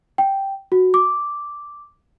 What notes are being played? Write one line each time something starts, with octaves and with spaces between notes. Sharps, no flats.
G5
F#4
D6